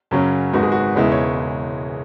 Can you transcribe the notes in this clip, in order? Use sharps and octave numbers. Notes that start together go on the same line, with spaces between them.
F#2 C#3 F#3 C#4
G#1 G#2 G#3 B3 F#4
G#4
F#4
E1 E2 C#3 E3 G#3 E5
C#5